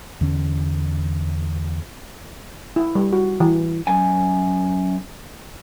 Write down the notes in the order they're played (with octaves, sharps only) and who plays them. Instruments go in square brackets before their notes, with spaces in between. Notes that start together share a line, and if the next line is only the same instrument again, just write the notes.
[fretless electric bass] E2 D3 C#4
[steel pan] E4
G3
F#4
E3
[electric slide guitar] F#2 G#5